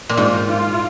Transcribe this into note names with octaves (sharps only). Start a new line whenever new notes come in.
A#2
G#2 F4
F4